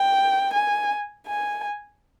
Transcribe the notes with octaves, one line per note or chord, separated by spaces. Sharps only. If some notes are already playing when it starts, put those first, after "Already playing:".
Already playing: G5
G#5
G#5